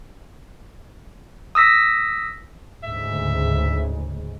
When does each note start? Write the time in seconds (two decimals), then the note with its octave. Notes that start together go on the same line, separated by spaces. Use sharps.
1.55 D#6 E6 A#6 B6
2.84 D2 G#2 C#3 E5